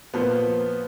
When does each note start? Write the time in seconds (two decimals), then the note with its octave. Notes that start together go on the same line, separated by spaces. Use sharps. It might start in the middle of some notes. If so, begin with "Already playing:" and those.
0.14 A#2 F3 B3